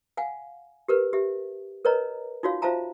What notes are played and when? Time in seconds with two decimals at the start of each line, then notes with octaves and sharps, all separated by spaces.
0.17 F5 F#5 G#5
0.88 G4 A#4 B4
1.13 G4 E5
1.85 A#4 B4 C#5 D#5 A#5
2.43 D#4 F4 F#4 C#5 F5
2.62 F4 C5 E5 F5 A5 A#5